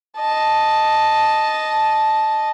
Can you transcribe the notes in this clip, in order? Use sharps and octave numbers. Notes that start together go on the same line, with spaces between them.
D#5 A5